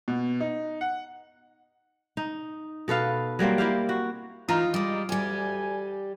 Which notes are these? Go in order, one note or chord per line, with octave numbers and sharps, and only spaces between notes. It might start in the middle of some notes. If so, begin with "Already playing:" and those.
B2
D#4
F#5
D#4
B2 A4 B4 F5
F#3 G3 A#3 C4
A#3 E4 G4 F5
F#4
E3 D#4 F4 A#5
G3 G#3 D#5 D6
D2 G3 G4 G#5